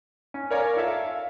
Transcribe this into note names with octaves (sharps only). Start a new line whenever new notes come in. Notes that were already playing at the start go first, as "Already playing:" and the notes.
C#4
A#4 C#5 D5 F5 G#5 A#5
F4 A4 E5 F5